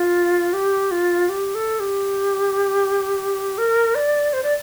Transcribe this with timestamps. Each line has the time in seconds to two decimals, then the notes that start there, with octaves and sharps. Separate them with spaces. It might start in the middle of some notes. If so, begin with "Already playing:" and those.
Already playing: F4
0.53 G4
0.91 F4
1.29 G4
1.55 A4
1.80 G4
3.58 A#4
3.95 D5
4.33 C5
4.43 D5